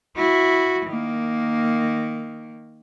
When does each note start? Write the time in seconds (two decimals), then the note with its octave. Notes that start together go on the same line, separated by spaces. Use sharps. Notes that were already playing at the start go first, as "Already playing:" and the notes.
0.17 E4 F#4
0.88 D#3 A#3